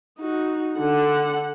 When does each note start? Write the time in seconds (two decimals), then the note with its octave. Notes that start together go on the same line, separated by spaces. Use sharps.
0.19 D#4 F#4
0.78 D3 F#5